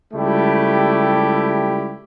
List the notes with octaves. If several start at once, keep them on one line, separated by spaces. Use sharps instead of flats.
C#2 G3 A3 E4 G4